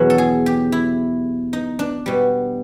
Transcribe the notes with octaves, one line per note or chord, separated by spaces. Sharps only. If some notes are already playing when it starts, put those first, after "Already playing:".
Already playing: E2 B2 F#3
A4
G#4
G4
E4
D#4
D4
B2 G3